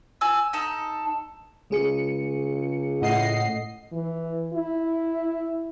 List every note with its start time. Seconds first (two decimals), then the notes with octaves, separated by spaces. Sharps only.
0.21 G#5 E6
0.53 D#4 A4
1.71 C#2 G#3 G#4 C#7
3.02 A2 D#5 F#5 C7
3.93 E3
4.54 E4